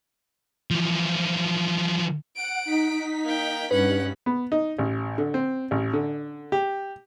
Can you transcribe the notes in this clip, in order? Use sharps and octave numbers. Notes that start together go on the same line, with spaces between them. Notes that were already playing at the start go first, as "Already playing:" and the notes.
E3 F3
F#5 D7
D#4 B6
A#3 G5
G2 C#4 B4 F#5
B3
D#4
A1
D3
C4
A1
D3
G4